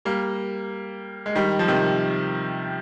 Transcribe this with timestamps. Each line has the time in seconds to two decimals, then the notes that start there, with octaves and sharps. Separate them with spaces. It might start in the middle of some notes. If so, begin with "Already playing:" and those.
0.05 G3 A#3
1.26 G#3
1.35 D#3 G3
1.59 F3
1.68 C3 D#3